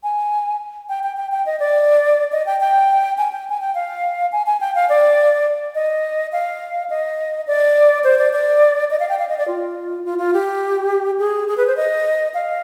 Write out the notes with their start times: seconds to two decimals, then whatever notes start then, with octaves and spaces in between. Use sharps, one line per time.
0.03 G#5
0.89 G5
1.03 G5
1.17 G5
1.32 G5
1.46 D#5
1.60 D5
2.32 D#5
2.46 G5
2.60 G5
3.18 G#5
3.32 G5
3.50 G#5
3.60 G5
3.75 F5
4.32 G#5
4.46 G#5
4.61 G5
4.75 F5
4.89 D5
5.75 D#5
6.32 F5
6.90 D#5
7.47 D5
8.04 C5
8.19 D5
8.33 D5
8.91 D#5
9.00 F5
9.09 G5
9.19 F5
9.29 D#5
9.38 D5
9.48 F4
10.05 F4
10.18 F4
10.34 G4
11.19 G#4
11.48 G#4
11.57 B4
11.67 C5
11.77 D#5
12.34 F5